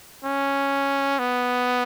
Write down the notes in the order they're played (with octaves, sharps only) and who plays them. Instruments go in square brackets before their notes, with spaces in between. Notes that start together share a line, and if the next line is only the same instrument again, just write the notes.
[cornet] C#4
B3